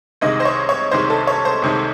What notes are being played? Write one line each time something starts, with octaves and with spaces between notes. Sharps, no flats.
C2 C3 D#3 G#3 D#5
C5
C#5
C#5
C2 C3 D#3 G#3 C5
A4
C#5
C5
C2 C3 D#3 G#3